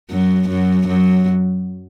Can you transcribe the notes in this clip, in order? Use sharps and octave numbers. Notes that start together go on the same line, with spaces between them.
F#2 F#3
F#2 F#3
F#2 F#3